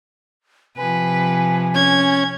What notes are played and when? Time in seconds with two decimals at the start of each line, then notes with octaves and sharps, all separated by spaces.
0.77 C3 F3 B4 G#5
1.75 C#4 G#6